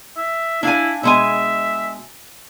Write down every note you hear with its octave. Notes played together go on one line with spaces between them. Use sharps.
E5
D4 E4 F5 G#5
B2 G#3 E5 G#5